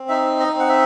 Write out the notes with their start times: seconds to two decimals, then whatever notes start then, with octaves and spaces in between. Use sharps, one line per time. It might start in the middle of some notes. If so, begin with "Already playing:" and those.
Already playing: C4
0.09 D#4 E5
0.40 D#5
0.54 C4
0.59 F#5
0.69 E5